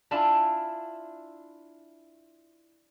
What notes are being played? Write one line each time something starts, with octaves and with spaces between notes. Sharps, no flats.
D4 E4 F4 E5 G#5